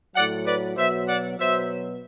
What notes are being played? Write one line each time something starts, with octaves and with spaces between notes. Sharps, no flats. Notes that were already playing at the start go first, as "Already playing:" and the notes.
A2 F#3 D5 F#5
B4 D5
B2 F#3 C5 E5
D5 F#5
B2 F#3 C5 E5